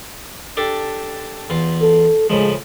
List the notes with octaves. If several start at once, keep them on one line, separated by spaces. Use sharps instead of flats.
D4 G4 A4
E2 F4
A4
A2 C#3 F3 G#3